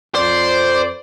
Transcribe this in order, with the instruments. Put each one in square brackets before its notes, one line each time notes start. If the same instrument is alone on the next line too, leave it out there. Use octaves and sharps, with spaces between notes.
[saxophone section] F2 D5 [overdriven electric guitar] C5